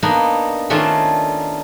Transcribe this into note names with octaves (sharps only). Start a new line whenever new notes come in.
A#3 B3 D4 D#4
D#3 A3 C#4 D4 F4